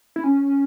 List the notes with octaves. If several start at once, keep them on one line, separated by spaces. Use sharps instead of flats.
E4
C#4